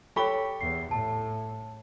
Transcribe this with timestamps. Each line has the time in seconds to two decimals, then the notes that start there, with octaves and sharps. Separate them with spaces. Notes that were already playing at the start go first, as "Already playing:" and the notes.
0.16 G4 A4 C#5 B5 C#6 G7
0.61 E2 C7
0.91 A2 A5